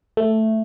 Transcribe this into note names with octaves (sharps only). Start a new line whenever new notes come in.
A3